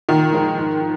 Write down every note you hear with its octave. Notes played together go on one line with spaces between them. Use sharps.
A#2 D#3
F3 G#3 D#4 A#4
G#2
F3